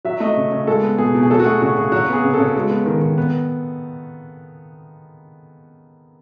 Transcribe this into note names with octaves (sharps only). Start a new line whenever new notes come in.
F#3 E5
A3 D#5
C#3
C#3
G#3 A4
B3
B2 G#4
B2
G#4
F#3 A4
F#4
A3 G#4
C#3 F#4
C#3 G#4
F#3 F#4
B3 G#4
C#3
A4
C#3
G#3
B3
D#3
D#3
B3